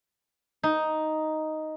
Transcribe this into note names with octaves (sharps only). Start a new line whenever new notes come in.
D#4